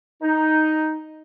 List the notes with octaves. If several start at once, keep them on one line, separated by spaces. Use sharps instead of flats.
D#4